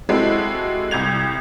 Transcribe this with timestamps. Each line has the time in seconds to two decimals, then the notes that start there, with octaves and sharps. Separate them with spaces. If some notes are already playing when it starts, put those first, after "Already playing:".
0.09 G#3 C4 E4 F#4 G4 A4
0.91 C2 G6 G#6 F7